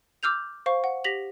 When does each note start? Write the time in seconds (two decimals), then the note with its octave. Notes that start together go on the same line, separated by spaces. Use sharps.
0.23 D6 E6 F6 G6 F7
0.66 C5 F5 C#6
0.84 F#5
1.04 G4 A#6 B6 F7 F#7